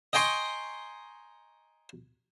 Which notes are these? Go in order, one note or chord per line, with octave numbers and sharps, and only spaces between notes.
D#5 G5 G#5 A#5 C6 C#6